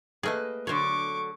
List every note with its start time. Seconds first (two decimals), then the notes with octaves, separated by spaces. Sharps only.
0.23 A3 A#3 G#4 B4 D#5
0.67 D3 F#3 C5 C#5 C#6 D6